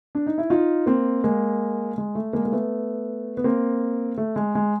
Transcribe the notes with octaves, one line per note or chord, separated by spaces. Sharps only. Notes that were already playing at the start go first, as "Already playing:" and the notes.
D4
D#4
E4
D#4 F4
A#3 C4
G#3 A#3
G#3
A3
G#3 A#3
A#3
A3 B3
B3
A#3 C4
A3
G#3
G#3